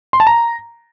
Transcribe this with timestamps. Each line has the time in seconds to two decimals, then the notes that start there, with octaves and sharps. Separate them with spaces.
0.13 C6
0.20 A5
0.27 A#5